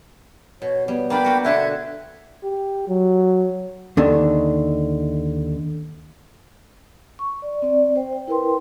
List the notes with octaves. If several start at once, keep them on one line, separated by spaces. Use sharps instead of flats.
B2 C#5
G3 B3
A#3 D4 D5 G5 B5
A#3 F#4
B2 D3 A3 E5 F#6 G#6
G4
F#3
D#2 D3 D#3
C#6
D5
C4 D5
C5 G5
G5
E4 A#4 B4 G5 C6